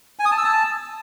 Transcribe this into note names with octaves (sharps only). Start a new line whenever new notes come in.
G#5
D#6
A5
E6
A5